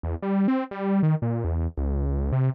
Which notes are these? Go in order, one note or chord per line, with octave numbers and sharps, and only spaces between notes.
E2
G3
C4
G3
D#3
A#2
E2
C#2
C3